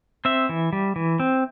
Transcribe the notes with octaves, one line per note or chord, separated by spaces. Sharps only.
C4 E5
E3
G3
E3
C4